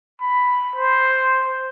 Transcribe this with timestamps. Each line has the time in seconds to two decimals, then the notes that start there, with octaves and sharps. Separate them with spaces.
0.21 B5
0.76 C5